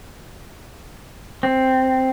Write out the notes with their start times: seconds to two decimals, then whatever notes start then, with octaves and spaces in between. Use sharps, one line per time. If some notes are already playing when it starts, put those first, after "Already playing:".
1.43 C4